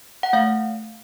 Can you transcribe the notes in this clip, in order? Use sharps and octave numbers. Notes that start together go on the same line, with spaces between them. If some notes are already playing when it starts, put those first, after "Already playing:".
F#5
A3 F5